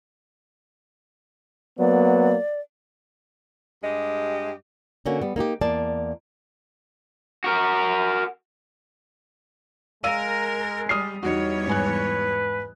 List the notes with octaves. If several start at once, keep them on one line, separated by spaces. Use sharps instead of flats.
F#3 A#3 B3 D5
G2 G#3 G4 D#5
D3 A#3 C#4 F#4
G3 B3
A#3 D#4 F#4 G4
E2 A#3 D5 A5
F#4 A#4
G#3 A#4 F5 E6 D#7
G3 D#6 F6 C7
E2 G3 D#4 F#4 C#5
G#2 B4 G#5 F#6